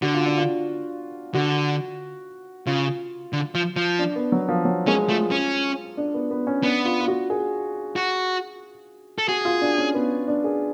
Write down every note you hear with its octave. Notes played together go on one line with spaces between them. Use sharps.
D3 F#4
F4
D4
F4
D3 F#4
C#3 F4
D3
F3
F3
D4
B3
F#3
F3
F#3
G#3 C#4
A3 F4
C#4
D4
B3
B3
C#4
B3 D4
F4
F4
F#4
G#4
F#4
A4
F#4 G#4
F4
D4
C#4
B3
D4
G#4